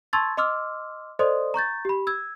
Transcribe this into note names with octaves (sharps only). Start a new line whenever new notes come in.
A5 C6 C#6 E6 G#6 A6
D#5 C6 D6 E6 F6
A4 C5 D5 D#5 C6 D#6
A#5 C#6 G6 A6
G4 B5
E6 G#6